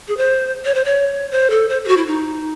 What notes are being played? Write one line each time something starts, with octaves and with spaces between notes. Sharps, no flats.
G#4
C5
C#5
C5
C#5
C5
A4
C5
G#4
F#4
E4
D#4